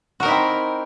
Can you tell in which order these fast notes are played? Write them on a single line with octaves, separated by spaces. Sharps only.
F#4 A#4 D#4 E4 C4